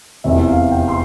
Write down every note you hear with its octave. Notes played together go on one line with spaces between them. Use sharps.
F1 E2 C3 E5
F5
G5
C6